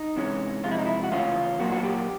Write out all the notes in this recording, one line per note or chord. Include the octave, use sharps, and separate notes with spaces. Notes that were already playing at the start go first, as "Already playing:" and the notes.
Already playing: D#4
C3 E3 G#3 C#4
C3 F3 G#3 F4
E4
D#4
E4
F#4
C#3 E3 A3 C#4 F4
A#2 F#3 A#3 D4 F#4
F#4
G4